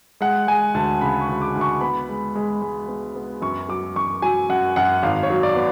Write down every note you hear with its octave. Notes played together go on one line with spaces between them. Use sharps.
G#3 F#5
G#3 G#5
D2 A5
C#3 B5
C#6
D2
D6
D2
C#6
B3 B5
G#3
G#3
G#3
B3
B3
F#2 C#6
F#3 D6
F#2 C#6
F#3 G#5
F#2 F#5
F#2 F#5
G#1 F5
C#5
F#3
D5
B3